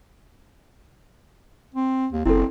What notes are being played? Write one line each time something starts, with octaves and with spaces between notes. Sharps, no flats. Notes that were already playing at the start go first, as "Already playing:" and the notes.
C4
D#2
F#1 C4 E4 A4